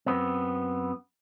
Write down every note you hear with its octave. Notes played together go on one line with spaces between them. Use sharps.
F#2 B3 C4